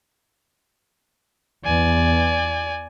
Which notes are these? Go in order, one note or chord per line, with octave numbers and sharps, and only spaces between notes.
E2 D5 G#5